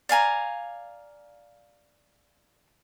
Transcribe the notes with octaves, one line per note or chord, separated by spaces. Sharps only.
D5 F5 G#5 A#5